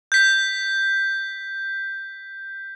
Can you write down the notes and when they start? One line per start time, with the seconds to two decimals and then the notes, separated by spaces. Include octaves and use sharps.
0.12 G6 B6